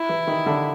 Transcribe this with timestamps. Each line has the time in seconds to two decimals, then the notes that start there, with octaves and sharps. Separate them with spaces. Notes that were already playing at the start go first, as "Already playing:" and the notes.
Already playing: E4
0.09 E3
0.27 D#3
0.46 D3